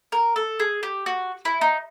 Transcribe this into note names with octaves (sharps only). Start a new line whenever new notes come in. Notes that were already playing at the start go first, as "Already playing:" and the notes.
A#4
A4
G#4
G4
F#4
E4
D#4